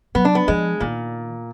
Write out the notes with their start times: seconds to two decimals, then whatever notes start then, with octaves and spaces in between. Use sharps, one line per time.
0.15 F#3 B3
0.25 D4
0.35 B3
0.48 F3 G#3
0.80 A#2 D#3